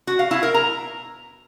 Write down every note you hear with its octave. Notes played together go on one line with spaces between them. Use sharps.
F#4
F5
E4
A#4
A#5